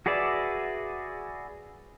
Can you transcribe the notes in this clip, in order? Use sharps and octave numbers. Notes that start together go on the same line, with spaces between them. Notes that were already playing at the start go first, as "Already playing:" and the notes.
F#4 G#4 B4 D5 E5